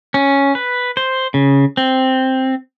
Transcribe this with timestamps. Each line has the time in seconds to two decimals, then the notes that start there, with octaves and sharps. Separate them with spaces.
0.14 C#4
0.55 B4
0.97 C5
1.34 C#3
1.77 C4